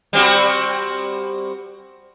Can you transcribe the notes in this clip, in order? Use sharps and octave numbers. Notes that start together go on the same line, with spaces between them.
G3 C4 F#4